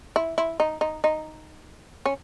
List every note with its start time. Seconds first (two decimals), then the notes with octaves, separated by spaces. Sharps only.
0.16 E4
0.38 E4
0.60 D#4
0.81 D#4
1.04 D#4
2.06 C#4